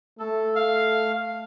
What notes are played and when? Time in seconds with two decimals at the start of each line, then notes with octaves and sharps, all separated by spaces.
0.19 A3 A4
0.56 F5